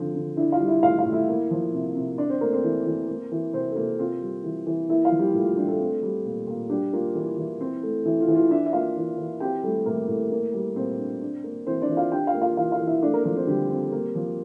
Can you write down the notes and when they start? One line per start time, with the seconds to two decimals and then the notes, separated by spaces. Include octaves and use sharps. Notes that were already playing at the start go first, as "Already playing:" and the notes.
Already playing: D3 F3 C4
0.15 D3
0.37 D4 E4 E5
0.52 F4 F5
0.60 G3
0.67 E4 E5
0.83 A2 F4 F5
0.98 F4 F5
1.05 A2
1.13 E4 E5
1.29 A#3
1.51 F3
1.74 C3
1.96 C3
2.18 D4 D5
2.30 C4 C5
2.41 A3 A#3 A#4
2.52 C4 C5
2.64 E3
2.86 E3
3.09 A#3
3.32 E3
3.53 C3 C4 C5
3.72 A4
3.76 C3 A#3 A#4
3.99 C4 F4
4.22 G3
4.44 E3
4.66 E3
4.89 A#3 E4 E5
5.04 F4 F5
5.12 F3
5.19 G3 G4
5.34 A2 F4
5.46 F4
5.57 G3 D4 G4
5.68 A3 A4
5.79 C4
6.03 G3
6.25 A#2
6.47 A#2
6.69 G3 D4 G4
6.93 A#3 F4
7.15 E3 E4
7.38 E3
7.61 C4
7.83 A3
8.05 E3 E4
8.21 F4
8.28 E3 E4
8.35 F4
8.51 D4 E4 E5
8.66 E5
8.73 A#3 F4 F5
8.96 E3
9.18 E3
9.40 C4 G4 G5
9.63 G3 A3 A4
9.86 A2 A#3 A#4
10.08 A2
10.32 A#3
10.54 G3
10.76 A#2 C4 C5
10.99 D4
11.21 D4
11.44 A#3
11.67 E3 C4 C5
11.82 D4 D5
11.89 E3
11.97 F4 F5
12.12 D4 G4 G5
12.27 F4 F5
12.34 A#3
12.41 F4 F5
12.57 E3 F4 F5
12.72 F4 F5
12.80 E3
12.87 E4 E5
13.02 A3 D4 D5
13.14 A#3 A#4
13.25 F3 A#3 A#4
13.36 C4 C5
13.47 D3 G3 G4
13.70 C4
13.92 A#3
14.15 F3